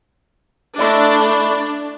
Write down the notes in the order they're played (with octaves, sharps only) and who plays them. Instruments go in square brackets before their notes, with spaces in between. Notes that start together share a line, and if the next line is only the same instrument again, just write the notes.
[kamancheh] A3 [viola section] D4 [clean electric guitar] E4 D5 D#5